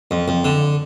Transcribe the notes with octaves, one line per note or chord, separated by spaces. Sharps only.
F2
F2
D3